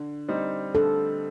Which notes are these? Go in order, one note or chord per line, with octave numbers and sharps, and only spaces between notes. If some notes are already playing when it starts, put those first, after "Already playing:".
Already playing: D3
G3 C4 D#4
D3 A4